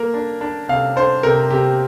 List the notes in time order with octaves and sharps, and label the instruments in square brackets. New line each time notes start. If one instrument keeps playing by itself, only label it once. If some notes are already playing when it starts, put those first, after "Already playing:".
Already playing: [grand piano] A#3 A#4
D4
D4
C3 F5
D4 C5
C3 A#4
C3 G4